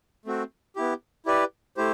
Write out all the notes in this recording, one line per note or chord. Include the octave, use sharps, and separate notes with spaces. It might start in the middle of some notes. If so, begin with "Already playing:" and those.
A3 C4 F#4
B3 E4 G4
E4 G4 B4 D5
A3 E4 G4 C5